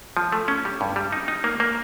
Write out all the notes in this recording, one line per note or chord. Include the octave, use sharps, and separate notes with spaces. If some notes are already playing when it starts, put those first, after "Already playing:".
F3
A3
C#4
G3
G2
G3
D#4
D#4
A#3
A#3